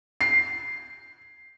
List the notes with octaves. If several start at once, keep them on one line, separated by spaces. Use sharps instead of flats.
C7